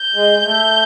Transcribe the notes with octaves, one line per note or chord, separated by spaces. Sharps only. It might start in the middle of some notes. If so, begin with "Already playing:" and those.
Already playing: G6
G#3
A3